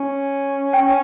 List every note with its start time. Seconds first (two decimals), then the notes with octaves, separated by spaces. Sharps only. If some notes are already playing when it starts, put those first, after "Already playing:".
Already playing: C#4
0.73 G5